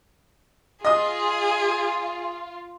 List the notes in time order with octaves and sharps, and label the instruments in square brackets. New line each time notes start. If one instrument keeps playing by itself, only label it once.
[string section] F4 [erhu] G#4 [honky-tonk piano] D#5 D#6